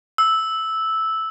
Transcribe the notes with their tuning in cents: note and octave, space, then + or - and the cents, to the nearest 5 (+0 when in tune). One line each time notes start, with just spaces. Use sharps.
E6 -10